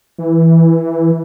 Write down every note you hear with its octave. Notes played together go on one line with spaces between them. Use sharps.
E3